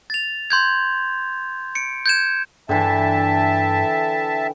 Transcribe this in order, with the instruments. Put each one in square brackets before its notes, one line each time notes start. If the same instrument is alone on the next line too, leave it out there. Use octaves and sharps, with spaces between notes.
[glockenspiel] A6 F7
C6 G6 G#6
C#7 D7
G6 G#6 E7
[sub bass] G2 [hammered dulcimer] D3 E3 [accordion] E5 A5 [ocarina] G5